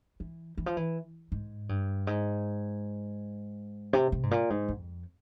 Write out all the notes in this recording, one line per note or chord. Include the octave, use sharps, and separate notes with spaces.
E3
E3
F3
E3
G#2
G2
G#2
C3
C3
G#2
A#2
G#2
F2